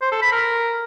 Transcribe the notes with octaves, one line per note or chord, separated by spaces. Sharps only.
C5
A4
B5
A#4